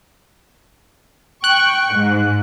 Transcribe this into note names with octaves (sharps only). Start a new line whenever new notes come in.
G5 C#6 F#6
G#2